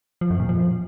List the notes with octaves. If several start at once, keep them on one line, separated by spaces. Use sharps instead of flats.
F3
F#2
A#2
F3